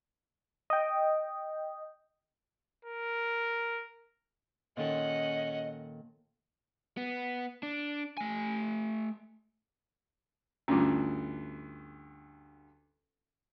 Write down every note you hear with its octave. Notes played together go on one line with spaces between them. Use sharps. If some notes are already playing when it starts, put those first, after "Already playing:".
D#5 G5
A#4
A#2 D#3 C#4 A4 D#5 F#5
B3
D4
A3 G#5
D2 G2 C#4 F4